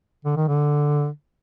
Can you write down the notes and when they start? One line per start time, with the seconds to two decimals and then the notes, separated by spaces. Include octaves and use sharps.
0.25 D3
0.36 D#3
0.48 D3